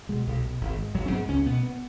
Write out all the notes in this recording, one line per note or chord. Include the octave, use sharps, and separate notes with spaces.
B2 G#3
B1
B2
G#1
G#2
G#1 F#3
C#4
G#2 B3
C#2 C#4
B2 B3
B3